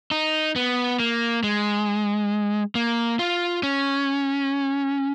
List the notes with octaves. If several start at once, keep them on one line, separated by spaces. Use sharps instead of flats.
D#4
B3
A#3
G#3
A#3
F4
C#4